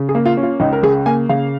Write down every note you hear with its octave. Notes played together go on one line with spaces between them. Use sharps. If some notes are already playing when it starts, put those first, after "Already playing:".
Already playing: C#3
G#4
A#3
F4
C#4
F4
C#2 D#4
A#4
C#3 G#4
A#3 G#5
C#3 F5